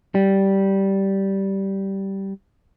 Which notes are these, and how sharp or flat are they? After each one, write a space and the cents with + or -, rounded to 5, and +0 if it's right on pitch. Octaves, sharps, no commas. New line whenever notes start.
G3 -10